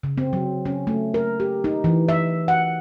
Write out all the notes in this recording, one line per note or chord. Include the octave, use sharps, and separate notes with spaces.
C#3
C4
F#3
C#4
A3
A#4
G4
D#4
E3
E5
F#5